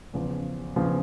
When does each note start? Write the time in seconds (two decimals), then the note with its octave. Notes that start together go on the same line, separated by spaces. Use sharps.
0.13 E2 C#3 F3
0.76 E2 C#3 F3